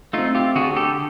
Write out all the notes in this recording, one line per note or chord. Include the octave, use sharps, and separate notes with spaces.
A3 C4 D#4 F4
F4 G4
D3 F#4 G#4
G4 A4